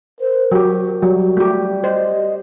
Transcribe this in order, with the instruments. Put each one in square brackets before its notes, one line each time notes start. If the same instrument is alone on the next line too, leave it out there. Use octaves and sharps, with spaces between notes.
[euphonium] A#4 [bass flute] C5
[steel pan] F#3 G4 [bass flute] F#4
[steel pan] F#3 [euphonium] G3 [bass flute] F#4
[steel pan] A3 G4
[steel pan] C5 [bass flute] D#5